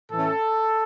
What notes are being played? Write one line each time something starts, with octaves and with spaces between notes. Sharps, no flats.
A2 E3 A3 C#4 A4